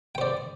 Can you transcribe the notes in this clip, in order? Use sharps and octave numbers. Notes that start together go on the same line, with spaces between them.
C5 D5 G5